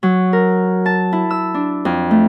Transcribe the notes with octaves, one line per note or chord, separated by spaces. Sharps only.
F#3
A#4
A5
E4
E6
D4
F2
A3